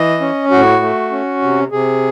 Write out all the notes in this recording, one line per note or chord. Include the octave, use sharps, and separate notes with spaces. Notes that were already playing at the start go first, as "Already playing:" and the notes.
Already playing: E3 D#5
C#4
A2 F#4
A3
C#4
C3
C3 G#4